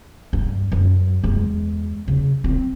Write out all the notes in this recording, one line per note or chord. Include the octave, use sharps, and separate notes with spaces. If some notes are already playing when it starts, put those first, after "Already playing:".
G2
F#2
E2 G#3
C#3
C4